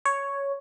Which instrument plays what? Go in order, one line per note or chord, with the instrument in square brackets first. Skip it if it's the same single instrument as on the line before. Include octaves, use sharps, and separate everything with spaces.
[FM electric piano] C#5